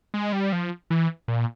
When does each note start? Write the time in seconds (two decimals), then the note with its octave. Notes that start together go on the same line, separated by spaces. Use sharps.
0.14 G#3
0.33 G3
0.52 F3
0.90 E3
1.28 A#2